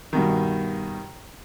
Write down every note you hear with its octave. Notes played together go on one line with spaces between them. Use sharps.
G2 B2 D#3